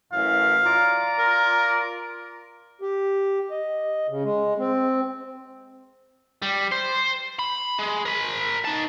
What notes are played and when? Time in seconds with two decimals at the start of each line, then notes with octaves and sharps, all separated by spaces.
0.13 F#2 A2 E3 F5
0.64 F4 D5 A#5
1.19 A#4
2.81 G4
3.51 D#5
4.09 C#3
4.24 G#3
4.59 C4
6.42 G3
6.71 C5
7.39 B5
7.79 G#3
8.05 A#4 B5
8.65 D#4 A5